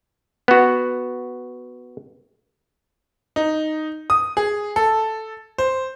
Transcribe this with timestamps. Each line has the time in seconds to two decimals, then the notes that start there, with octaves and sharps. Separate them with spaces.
0.48 B3 F#4
3.36 D#4
4.10 D#6
4.37 G#4
4.76 A4
5.58 C5